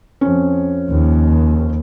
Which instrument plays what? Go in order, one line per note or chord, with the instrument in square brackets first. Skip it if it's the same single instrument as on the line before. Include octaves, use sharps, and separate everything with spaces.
[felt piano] F2 C#4
[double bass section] D#2